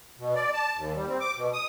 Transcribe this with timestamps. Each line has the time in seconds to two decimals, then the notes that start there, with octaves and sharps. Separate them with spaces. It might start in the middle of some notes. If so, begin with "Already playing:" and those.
0.19 B2
0.35 D5
0.54 A5
0.76 D#2
0.96 G3
1.09 C4
1.20 D6
1.36 B2
1.53 D#6